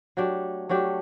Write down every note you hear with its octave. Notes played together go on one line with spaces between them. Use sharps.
F#3 A3 D4 G4
F#3 A3 D4 G4